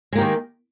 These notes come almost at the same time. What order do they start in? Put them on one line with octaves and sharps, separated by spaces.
G#3 A#3 G4 D#3